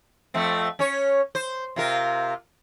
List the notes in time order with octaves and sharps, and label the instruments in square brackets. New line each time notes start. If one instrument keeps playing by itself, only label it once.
[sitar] F2 A3 C4
C#4 C#5
C5
C3 F4 A#4